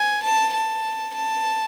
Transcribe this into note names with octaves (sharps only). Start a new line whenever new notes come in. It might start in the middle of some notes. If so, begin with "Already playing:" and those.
Already playing: G#5
A5
A5
A5